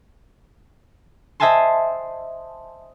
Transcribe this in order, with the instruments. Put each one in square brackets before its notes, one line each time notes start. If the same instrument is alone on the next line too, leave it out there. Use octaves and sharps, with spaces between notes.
[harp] C5 D#5 E5 G#5 A5 C6